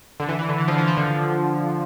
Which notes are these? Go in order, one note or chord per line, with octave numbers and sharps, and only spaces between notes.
D3
E3
E3
D3
E3
F3
E3
F3
D3